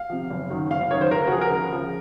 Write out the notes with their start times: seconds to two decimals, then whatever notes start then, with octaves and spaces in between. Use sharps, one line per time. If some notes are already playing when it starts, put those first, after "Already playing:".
Already playing: F5
0.10 C3 F3
0.30 F#1
0.50 F#2 D#3 F#3
0.70 F#1 F5
0.81 F5
0.91 F#2 D#3 F#3 C#5
1.01 C5
1.11 C#2 A#4
1.22 A#4
1.27 F#4
1.32 C#3 F3 G#4
1.41 A#4
1.52 C#2
1.72 C#3 F3